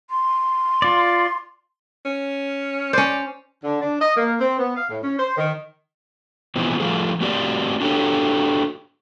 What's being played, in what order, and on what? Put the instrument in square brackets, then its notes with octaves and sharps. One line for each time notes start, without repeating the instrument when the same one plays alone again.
[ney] C6
[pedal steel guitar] F4 D5
[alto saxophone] C#4
[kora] C#4 C5 [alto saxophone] D5
[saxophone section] D3
D4
D#5
A#3
C4
B3
F5
A2
C#4
C5
D#3
[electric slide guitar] B2 E3 F3 C4
F3 A3 F4 G#4 A4
A3 C4 F#4 G4 C5 D5
D4 F#4 G4 A4 C#5